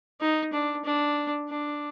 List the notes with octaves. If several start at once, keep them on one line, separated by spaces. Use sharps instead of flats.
D#4
D4
D4
D4